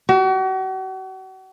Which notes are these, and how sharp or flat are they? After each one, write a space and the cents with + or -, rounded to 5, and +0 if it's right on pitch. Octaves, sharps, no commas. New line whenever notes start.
F#4 +40